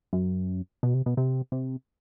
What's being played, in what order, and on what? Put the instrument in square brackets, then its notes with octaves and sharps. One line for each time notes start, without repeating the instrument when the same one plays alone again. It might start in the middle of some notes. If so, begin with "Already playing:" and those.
[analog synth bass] F#2
B2
C3
B2
C3
C3